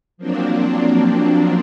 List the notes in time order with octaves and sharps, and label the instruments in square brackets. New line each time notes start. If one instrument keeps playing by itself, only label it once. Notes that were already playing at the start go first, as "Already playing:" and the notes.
[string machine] F3 F#3 A#3 C4 D4